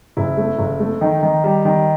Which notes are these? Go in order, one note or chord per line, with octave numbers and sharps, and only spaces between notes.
F#1 E4
A3
F#1
A3
D#3 D#4
D#3
G3
D#3